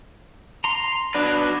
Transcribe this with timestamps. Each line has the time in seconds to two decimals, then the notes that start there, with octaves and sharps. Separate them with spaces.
0.64 A#5 C6
1.15 F#3 D4 F#4 B4